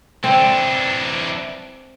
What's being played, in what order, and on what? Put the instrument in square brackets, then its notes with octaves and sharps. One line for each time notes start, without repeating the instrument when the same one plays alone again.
[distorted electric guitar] E3 D4 [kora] C4